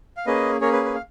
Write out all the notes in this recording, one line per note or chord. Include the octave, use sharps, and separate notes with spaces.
F5
A#3 C#4 G#4 B4 D#5
A#3 C#4 G#4 A#4 C#5
B4
B4
F5